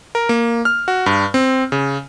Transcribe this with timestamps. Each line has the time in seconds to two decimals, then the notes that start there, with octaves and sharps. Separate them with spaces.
0.15 A#4
0.29 A#3
0.65 F6
0.88 F#4
1.06 G2
1.34 C4
1.72 C#3